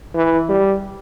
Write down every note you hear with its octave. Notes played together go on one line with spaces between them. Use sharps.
E3
G3